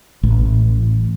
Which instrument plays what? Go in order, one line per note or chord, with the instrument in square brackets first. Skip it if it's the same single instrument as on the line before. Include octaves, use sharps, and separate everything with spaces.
[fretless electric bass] A1